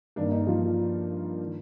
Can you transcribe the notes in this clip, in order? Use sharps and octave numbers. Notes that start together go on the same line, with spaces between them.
G2 D#3 A#3 D4
D#4
F3 F4
D#3